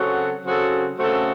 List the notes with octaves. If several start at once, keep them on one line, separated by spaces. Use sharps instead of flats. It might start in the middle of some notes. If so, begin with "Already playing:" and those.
Already playing: C#3 F#3 C4 F#4 A4
C#3 F#3 C4 F#4 A4
C#3 A3 C4 F#4 A4